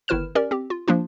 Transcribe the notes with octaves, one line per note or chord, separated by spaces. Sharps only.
G1 D#3 E4 B4 F6 E7
C#4 G4 A#4 D5
C4 G4
F4
F3 A#3 D4 F4